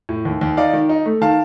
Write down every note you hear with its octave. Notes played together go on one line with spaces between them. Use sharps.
A2
D#2
D#2
D#4 D5 F5
D#3
D#4
A3
D#3 F5 A5